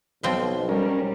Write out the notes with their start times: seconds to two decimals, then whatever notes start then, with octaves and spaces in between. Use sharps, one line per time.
0.23 B1 B2 F3 C4
0.69 G3 C#4 A#4